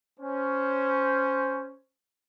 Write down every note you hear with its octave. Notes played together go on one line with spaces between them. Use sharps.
C#4 C5